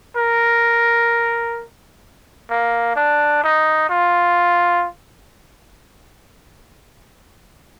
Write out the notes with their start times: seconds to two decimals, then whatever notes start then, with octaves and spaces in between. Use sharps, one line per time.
0.17 A#4
2.51 A#3
2.96 D4
3.44 D#4
3.90 F4